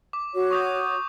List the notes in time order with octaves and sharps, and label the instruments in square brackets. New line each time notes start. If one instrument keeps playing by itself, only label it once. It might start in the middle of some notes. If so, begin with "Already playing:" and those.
[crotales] D6
[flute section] F#4 C#5
[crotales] C#6 D#6 G6